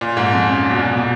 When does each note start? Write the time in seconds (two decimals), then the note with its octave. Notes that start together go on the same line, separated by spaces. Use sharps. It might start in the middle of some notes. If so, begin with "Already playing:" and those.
0.01 A#2
0.17 G#2
0.32 F2
0.47 F#2
0.71 B2
0.77 A#2
0.93 B2